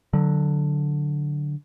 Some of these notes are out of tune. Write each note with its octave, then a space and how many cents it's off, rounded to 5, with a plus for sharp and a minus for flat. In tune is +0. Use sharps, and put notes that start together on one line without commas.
D3 +0 F#3 -10